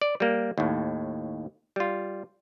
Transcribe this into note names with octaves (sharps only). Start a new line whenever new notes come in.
D5
G3 A#3
D#2 A2
G3 F4